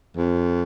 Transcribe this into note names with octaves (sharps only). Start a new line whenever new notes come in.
F2